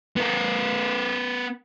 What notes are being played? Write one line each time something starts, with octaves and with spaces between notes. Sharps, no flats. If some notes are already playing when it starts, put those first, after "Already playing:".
B3 A#4